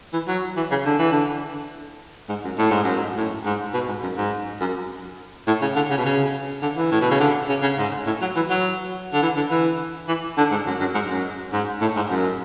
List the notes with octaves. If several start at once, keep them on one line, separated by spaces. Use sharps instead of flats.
E3
F#3
E3
C#3
D3
E3
D3
G#2
F#2
A2
G#2
F#2
G#2
A2
G#2
B2
G#2
F#2
G#2
F#2
A2
C#3
D3
C#3
B2
C#3
D3
E3
A2
B2
C#3
D3
C#3
C#3
G#2
A2
F#3
E3
F#3
D3
E3
D3
E3
E3
D3
G#2
F#2
F#2
G#2
F#2
G#2
A2
G#2
F#2